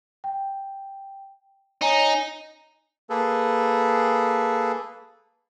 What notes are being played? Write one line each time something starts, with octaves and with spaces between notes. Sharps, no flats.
G5
D#4 C#5 G#5 A#5
A#3 G#4 A4 B4